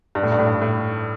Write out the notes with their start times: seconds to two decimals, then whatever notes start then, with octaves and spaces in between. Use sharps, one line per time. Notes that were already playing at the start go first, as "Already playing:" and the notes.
0.15 G2
0.23 A2
0.32 G2
0.39 A2
0.47 G2
0.62 A2